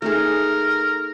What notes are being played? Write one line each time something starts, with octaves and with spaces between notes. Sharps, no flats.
A3 D#4 G#4 A#4